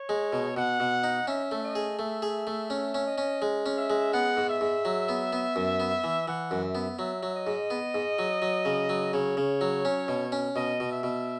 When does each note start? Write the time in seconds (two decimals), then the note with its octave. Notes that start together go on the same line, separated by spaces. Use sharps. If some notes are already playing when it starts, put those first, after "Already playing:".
Already playing: C#5
0.09 G#3
0.33 B2
0.56 B2 F#5
0.80 B2
1.04 D#4
1.27 C#4 E5
1.52 A3
1.64 D#5
1.75 G#4
1.99 A3 E5
2.22 G#4
2.47 A3
2.70 C#4 E5
2.94 C#4
3.06 D#5
3.18 C#4
3.42 G#3
3.66 C#4
3.77 E5
3.90 G#3
4.13 B3 F#5
4.37 G#2
4.49 E5
4.61 G#2
4.85 F#3
5.09 B3
5.33 B3
5.56 F#2
5.80 B3
6.04 E3
6.28 E3 F#5
6.51 F#2
6.64 E5
6.75 B3
6.99 F#3 E5
7.23 F#3
7.35 D#5
7.47 G#2
7.70 B3
7.94 G#2
8.19 F#3
8.42 F#3
8.65 C#3
8.89 F#3
9.13 C#3 C#5
9.37 C#3
9.61 F#3
9.85 C#4
10.08 B2
10.32 C#4
10.56 B2 D#5
10.80 B2
10.92 E5
11.03 B2